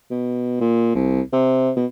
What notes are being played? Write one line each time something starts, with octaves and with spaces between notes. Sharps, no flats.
B2
A#2
C2
C3
B2